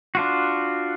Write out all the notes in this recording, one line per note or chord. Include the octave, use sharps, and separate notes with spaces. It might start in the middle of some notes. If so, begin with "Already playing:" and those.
D4 F4 F#4